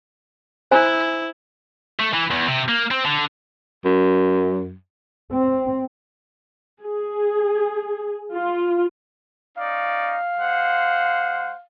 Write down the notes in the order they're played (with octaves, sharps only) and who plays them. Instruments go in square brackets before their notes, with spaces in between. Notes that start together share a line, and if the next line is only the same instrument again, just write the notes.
[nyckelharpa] E4 [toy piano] C5 G#5 A#5
[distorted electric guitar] A3
E3
E2
C3
A#3
C4
D3
[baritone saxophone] F#2
[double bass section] C4
[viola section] G#4
F4
[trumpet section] C#4 D#4 D5 [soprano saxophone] F5
[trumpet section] G#3 C5 F#5